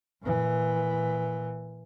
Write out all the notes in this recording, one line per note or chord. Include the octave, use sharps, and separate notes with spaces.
A#2 E3